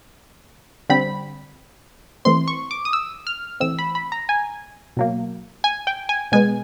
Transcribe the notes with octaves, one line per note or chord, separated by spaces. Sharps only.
D3 G3 C4 B5
E3 A3 C4 C6
C#6
D6
D#6
E6
F6
E3 A3 C4 E6
B5
B5
A#5
G#5
B2 F#3 A#3
G#5
G5
G#5
B2 G#3 B3 G#5